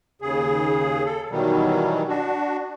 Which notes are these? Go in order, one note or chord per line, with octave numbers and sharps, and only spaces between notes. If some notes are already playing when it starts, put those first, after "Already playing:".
D#2 C#3 G#4
A4
B2 D#3 E3 F#3 G3
D4 F#4